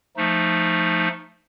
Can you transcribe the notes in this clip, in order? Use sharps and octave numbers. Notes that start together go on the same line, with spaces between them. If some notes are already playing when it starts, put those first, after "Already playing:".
F3 A3 D#4